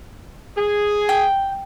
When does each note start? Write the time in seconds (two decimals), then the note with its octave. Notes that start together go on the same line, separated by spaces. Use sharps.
0.56 G#4
1.09 G5